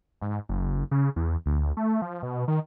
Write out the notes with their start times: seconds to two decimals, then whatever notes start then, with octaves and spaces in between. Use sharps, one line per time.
0.21 G#2
0.49 F#1
0.91 C#3
1.16 E2
1.46 D2
1.77 A3
2.02 F3
2.23 B2
2.48 D#3